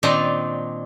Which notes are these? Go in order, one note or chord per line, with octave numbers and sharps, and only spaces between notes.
A#2 D#3 C4 D4 D#4 A#5